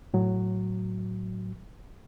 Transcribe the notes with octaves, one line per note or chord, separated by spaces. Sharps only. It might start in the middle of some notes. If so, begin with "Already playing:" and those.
A2 F#3